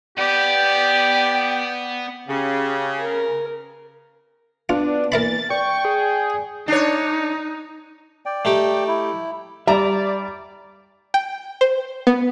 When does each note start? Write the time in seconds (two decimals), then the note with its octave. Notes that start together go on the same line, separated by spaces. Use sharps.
0.18 B3 G4 D5 G5
2.29 C#3 G4
3.01 A#4
4.69 B3 D4 F4
5.12 E3 A#3 A#4 E5 B5 A6
5.50 D5 G5 C#6
5.85 G#4
6.68 D4 D#4 C#5
8.26 D5 G5
8.45 A3 D#4 G4
8.88 E4
9.68 G3 D5 E5 A#5
11.14 G5
11.61 C5
12.07 B3